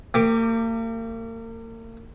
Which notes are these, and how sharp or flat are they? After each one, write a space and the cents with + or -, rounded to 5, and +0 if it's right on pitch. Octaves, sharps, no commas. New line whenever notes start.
A#3 -40 G4 +10 D6 +0